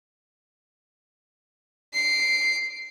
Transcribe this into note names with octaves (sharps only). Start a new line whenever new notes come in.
C7 D7